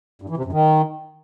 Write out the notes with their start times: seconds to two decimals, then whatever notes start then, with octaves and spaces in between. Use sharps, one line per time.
0.22 G2
0.29 E3
0.37 C3
0.45 F#2
0.53 D#3